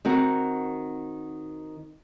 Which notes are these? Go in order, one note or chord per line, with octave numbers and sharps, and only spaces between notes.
D#3 C4 F#4 A#4